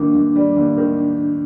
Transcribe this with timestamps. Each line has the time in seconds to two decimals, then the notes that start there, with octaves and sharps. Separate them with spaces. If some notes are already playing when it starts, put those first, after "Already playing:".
Already playing: D#2 D#3 D4
0.14 D#2
0.36 G3
0.56 D#2
0.77 D#3